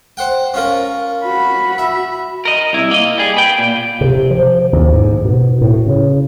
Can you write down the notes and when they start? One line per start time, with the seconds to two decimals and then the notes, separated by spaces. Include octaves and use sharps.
0.17 C5 F#5 G5
0.54 C#4 F4 A#4
1.24 F#4 B5
1.78 E5
2.45 A#4 D#5
2.73 C2 E4
2.91 A#3 D#5
3.18 G3 G#4
3.36 B4 G5
3.59 A#2
4.01 C3
4.31 F3
4.73 D#2
4.93 G#2
5.25 B2
5.61 A2
5.87 C#3